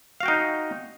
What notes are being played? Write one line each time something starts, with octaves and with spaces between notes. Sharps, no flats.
D#4 F#4 F5 G5